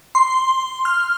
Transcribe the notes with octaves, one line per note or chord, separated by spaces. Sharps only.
C6
F6